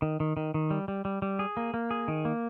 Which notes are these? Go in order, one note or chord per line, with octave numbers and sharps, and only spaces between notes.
D#3
D#3
D#3
D#3
G3
G3
G3
G3
G#4
A#3
A#3
G#4
D#3
A#3